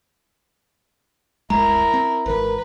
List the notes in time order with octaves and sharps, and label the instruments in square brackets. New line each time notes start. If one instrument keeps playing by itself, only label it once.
[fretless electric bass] D1 G1 G#3 [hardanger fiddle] E4 A#4 [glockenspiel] A#5
[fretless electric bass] C4
[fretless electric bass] G#1 E3 [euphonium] A#4 [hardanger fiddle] B4